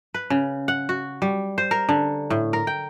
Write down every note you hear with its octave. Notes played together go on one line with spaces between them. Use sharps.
B4
C#3
F#5
F#4
G3
C5
A#4
D3
A2
A#4
G5